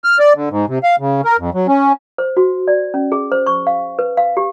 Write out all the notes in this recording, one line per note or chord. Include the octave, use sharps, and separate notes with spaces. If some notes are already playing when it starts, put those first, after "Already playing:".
F6
D5
D3
G#2
C3
F5
C#3
A#4
F2
F#3
C#4
C5
F#4
D5
C#4
G#4
C5
C#6
F5
B4
F5
G4